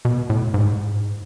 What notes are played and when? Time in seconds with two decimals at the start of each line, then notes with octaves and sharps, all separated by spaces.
0.05 B2
0.30 A2
0.54 G#2